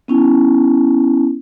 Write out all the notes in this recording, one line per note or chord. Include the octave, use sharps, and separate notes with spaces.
B3 C#4 E4